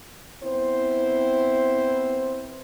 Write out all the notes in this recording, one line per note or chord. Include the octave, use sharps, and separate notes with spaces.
B3 C4 E4 C5